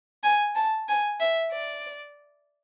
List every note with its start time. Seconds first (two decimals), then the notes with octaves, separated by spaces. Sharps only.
0.24 G#5
0.55 A5
0.89 G#5
1.20 E5
1.53 D5